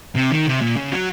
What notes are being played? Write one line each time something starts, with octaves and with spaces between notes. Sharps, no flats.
C3
D#3
C3
A#2
C#3
F#3